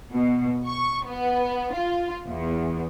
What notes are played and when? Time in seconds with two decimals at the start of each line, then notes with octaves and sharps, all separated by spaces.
0.11 B2
0.66 C#6
1.07 B3
1.73 F4
2.28 E2